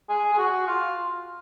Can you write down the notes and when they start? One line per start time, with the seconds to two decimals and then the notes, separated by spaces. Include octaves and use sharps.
0.09 G#4
0.32 G#4
0.38 F#4
0.67 F4